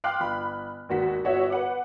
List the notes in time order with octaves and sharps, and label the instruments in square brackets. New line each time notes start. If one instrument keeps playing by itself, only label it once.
[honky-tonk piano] F5 G5 C6 D6 F6 F#6
G1 B5
G#1 D#2 F#4 B6
G1 F#4 C#5 E5
B4 F#5 D6